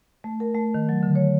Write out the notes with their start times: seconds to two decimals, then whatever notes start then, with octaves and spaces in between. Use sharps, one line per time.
0.24 A3
0.40 A#4
0.55 A3
0.74 D#3
0.89 F#3
1.03 D3
1.15 C#5